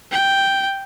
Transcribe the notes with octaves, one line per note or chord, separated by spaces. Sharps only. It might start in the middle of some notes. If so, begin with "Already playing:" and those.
G5